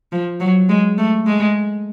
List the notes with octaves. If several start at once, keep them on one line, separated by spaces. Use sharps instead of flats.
F3
F#3
G#3
A3
G#3